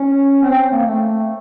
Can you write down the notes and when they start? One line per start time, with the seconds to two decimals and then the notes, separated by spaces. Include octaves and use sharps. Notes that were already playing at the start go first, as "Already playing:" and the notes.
Already playing: C#4
0.43 C4
0.72 A#3
0.85 A3